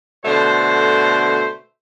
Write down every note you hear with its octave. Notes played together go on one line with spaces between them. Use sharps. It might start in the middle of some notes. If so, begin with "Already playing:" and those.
B2 D3 A3 C5